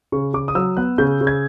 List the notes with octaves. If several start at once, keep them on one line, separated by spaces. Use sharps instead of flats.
C#3 C#6
C#3 D6
D#6
F#3 E6
B3 F#6
C#3 G6
C#3
G#6